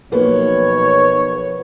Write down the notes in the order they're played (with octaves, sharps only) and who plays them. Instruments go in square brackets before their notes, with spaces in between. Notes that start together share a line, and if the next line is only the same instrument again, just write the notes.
[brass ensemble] B1 C#5 [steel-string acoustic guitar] F3 A#3 B3